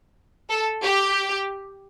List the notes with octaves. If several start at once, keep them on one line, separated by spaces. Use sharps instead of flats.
A4
G4